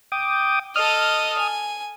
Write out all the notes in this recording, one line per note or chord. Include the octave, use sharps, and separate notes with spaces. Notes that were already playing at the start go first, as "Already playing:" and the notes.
G5 D6 D#6
A4 D#5 D#6 F6
G#5